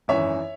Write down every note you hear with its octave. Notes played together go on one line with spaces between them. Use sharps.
G#1 F#2 E3 C#5 E5